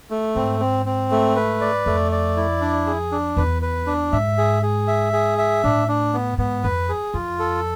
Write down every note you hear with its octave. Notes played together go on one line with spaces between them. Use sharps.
A3
G#2 C4
C4
C4
A3
B4
D5
F2 A3
D5
E4
D4
G#4
D4
E2 B4
B4
D4
G#2 E5
G#4
G#4
E5
G#4
E5
A2 D4
D4
B3
G#2 B3
F2 B4
G#4
F2 F4
A4